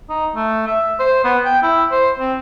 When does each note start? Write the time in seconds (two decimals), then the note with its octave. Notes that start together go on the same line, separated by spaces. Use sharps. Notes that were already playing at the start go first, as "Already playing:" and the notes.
0.09 D#4
0.35 A3
0.67 E5
1.00 C5
1.24 B3
1.45 G5
1.63 E4
1.92 C5
2.19 C4